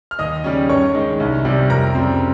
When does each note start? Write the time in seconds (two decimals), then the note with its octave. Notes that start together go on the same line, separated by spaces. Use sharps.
0.11 F6
0.19 D#2 D#5 D#6
0.44 C#3 G3 C#4
0.69 G2 C#5 C#6
0.95 D#3 G#3 D#4
1.20 C2
1.45 C3 G3
1.70 F2 A#4 A#5
1.95 C#3 G3 C4